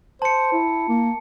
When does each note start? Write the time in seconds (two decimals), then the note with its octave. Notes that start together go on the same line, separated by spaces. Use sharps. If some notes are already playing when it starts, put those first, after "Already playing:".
0.22 C5 A5 C#7
0.53 E4
0.89 A#3